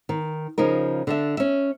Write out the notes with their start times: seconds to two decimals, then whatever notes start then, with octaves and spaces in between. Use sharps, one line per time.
0.09 D#3
0.58 C#3 F3 D#4 A#4
1.07 D3 D4 E5
1.37 C#4 E5